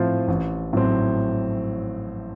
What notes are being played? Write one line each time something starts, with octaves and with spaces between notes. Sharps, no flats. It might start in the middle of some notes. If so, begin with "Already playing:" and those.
Already playing: A2 F3 C4 F4 C5
A1
A2 F#3 C4